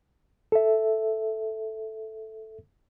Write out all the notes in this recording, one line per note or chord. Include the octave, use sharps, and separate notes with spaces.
A4 E5